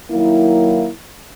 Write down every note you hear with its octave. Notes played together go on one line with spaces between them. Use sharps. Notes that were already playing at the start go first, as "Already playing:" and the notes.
D#3 F#3 A#3 E4